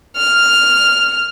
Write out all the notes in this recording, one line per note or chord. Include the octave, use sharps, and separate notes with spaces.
F6